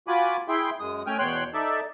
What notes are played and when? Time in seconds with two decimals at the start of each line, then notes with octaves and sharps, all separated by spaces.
0.08 F4 F#4 G#5 B5 D6
0.48 E4 G#4 E5 G5 C6
0.80 F#2 G#3 D#6
1.07 A3 C#4 G5 G#5 F6
1.19 E2 B2 C#5 G5 C6 F#6
1.54 D#4 A4 D5 E5 A5